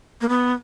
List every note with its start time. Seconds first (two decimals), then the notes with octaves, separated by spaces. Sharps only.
0.21 A#3
0.29 B3